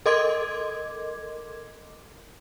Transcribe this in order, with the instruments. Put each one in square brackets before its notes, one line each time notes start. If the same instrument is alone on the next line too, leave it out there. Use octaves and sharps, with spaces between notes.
[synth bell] A4 A#4 D#5 C6 D6 G#6